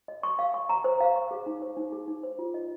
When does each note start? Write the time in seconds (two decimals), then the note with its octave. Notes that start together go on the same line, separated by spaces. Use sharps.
0.08 D#5
0.23 C#6
0.39 F5
0.54 C#6
0.69 A#5
0.84 C5
1.01 F5
1.16 C#6
1.31 G#4
1.46 D#4
1.62 C5
1.77 D#4
1.92 G#4
2.08 D#4
2.23 C5
2.39 F4
2.54 D#5